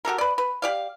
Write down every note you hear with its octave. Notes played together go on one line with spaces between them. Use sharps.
F#4 G4 A4 A#4
B4 D5
B4
G4 D5 F5